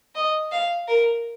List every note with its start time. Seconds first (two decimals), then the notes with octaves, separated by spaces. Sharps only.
0.15 D#5
0.51 F5
0.88 A#4